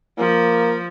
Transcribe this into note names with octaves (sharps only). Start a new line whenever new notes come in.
F3 A#3